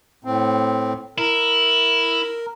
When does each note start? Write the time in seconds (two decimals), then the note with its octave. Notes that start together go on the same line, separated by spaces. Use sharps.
0.25 A2 C4
1.18 E4 A#4